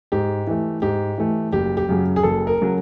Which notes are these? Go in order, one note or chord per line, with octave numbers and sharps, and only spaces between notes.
G#2 G4
E3 A3
G#2 G4
E3 A3
F#1 G4
G4
F#2 C#3 F#3
G#4
F#1 A4
A#4
C#3 F#3